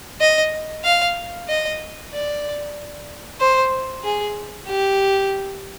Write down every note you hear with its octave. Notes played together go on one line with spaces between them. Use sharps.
D#5
F5
D#5
D5
C5
G#4
G4